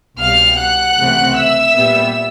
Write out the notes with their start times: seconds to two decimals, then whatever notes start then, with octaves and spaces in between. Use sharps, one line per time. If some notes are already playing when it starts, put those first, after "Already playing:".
0.19 C2 B2 G3 F5 F6
0.58 F#5 F#6
0.98 C#2 C3 E3 A3 C4
1.37 E5 E6
1.75 A#2 G3 B3